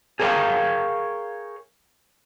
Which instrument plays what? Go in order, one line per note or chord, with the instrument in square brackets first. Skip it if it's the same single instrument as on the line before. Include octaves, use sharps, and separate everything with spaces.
[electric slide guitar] G#4 A#4 C#5 D#5 F5 G5